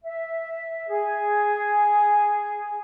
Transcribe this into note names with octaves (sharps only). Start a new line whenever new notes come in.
E5
G#4